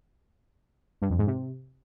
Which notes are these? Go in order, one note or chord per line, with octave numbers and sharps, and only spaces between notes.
G2
F2
G#2
C3